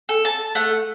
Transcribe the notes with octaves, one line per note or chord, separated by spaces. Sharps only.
A4
A5
A3 F#5